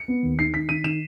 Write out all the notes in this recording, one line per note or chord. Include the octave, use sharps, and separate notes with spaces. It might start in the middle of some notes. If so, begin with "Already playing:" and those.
Already playing: C#7
B3
D#2
D#3 C7
D#3 B6
D#3 D#7
D#3 E7